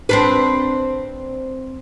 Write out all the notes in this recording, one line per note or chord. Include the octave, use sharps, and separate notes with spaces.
C4 D4 B4